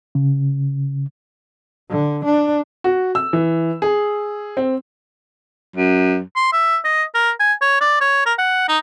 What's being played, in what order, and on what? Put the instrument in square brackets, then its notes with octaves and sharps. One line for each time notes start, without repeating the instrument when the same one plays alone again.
[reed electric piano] C#3
[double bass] D3
D4
[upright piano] F#4
E6
E3
G#4
C4
[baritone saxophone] F#2
[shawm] C6
E5
D#5
A#4
G#5
C#5
D5
C#5
A#4
F#5
D#4